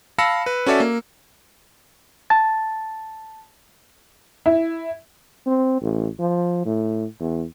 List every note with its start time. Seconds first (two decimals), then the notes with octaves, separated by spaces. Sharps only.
0.18 F5 A5 B5 E6 A#6 C#7
0.46 B4
0.66 C#4 F#4 A4 D5 E5
0.80 A#3
2.30 A5 A6
4.46 E4
5.47 C4
5.82 A1
6.19 F3
6.65 A2
7.20 E2